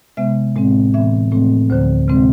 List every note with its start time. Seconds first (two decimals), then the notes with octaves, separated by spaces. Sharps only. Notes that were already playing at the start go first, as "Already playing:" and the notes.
0.17 C3 G#3 B3 E5
0.56 A2 G#3 C4
0.94 A2 E3 B3 E5
1.32 A2 F3 A3 C4
1.70 D2 D3 F3 C5
2.08 C3 G#3 C4